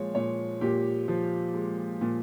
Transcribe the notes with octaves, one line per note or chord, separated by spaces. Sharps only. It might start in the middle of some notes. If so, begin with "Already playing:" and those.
Already playing: A#2 F3 G#3 C#5
A#2 C#5
A#2 G4
F3
G#3
A#2